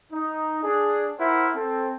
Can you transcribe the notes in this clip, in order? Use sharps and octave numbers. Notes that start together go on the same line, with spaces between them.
D#4
D4 G#4
E4 A#4 C5 F#5
C4 A4